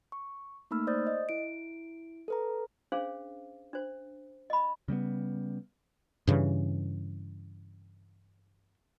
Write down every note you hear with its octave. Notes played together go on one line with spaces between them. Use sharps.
C#6
A3 A#3 D#4 B5 E6 F6
C5 D5 D#6 G6 A6
D#5
E4 D7
A4 B4 A#5
C#4 D4 G#4 C5 F5
D4 C5
D#5 B5
C#3 G3 G#3 B3
G2 C#3 E3